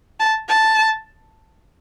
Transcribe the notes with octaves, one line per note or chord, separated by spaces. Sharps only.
A5
A5